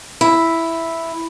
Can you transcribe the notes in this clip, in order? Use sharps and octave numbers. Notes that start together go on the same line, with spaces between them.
E4